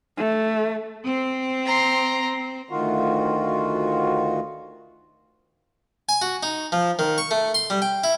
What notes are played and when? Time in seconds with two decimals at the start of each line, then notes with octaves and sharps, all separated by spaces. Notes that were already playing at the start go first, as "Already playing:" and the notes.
0.17 A3
1.05 C4
1.66 A#5 C6
2.70 D2 D#3 F4 F#4
6.09 G#5
6.22 F#4
6.43 D#4
6.72 F3
6.99 D#3
7.18 C#6
7.31 A3
7.54 C6
7.70 G3
7.82 G5
8.04 E4